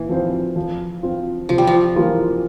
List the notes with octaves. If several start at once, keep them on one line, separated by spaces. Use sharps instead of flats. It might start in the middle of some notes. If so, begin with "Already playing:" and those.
Already playing: A#2 E3
F3 C4 F4 C5
F3
C4 F4
C3 F3
G3
F3
E3 G3 A#3 F4